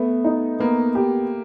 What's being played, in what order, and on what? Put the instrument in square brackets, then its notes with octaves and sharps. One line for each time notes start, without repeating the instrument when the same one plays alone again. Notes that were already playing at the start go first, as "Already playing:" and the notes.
Already playing: [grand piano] A3 [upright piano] B3
[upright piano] D#4
[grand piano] A#3 [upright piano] B3
[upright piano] G4